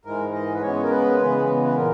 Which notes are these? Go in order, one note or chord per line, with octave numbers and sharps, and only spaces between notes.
G#2 E3 G#3 A#4
D#5
B4
C#3 G#3 B3 C#5
A#4
B4
C#3 E3 G#3 B3
B4
A#2 A#4